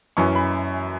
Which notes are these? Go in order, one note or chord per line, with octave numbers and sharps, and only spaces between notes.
F#2 E3 C#4 C#6
B5